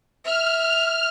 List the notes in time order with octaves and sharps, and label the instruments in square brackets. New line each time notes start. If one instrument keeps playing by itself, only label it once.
[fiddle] E5 [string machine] F6